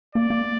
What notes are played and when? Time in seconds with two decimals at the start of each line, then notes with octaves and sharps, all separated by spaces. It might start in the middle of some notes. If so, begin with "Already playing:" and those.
0.15 A#3 D5
0.30 A#3